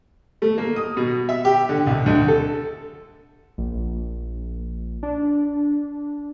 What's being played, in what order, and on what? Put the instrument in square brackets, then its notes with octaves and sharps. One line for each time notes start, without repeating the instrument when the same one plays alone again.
[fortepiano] A3
A#3
D#6
B2
E5
G4
D3
C2
D2
A4
[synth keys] A#1
D4